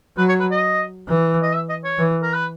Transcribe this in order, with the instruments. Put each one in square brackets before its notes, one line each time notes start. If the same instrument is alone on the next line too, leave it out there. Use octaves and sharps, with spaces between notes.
[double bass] F#3 [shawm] B4
[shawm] C#5
B4
D#5
[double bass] E3
[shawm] D#5
E5
D#5
C#5
[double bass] E3
[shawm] A#4
B4